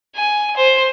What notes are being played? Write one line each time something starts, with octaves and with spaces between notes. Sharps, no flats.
G#5
C5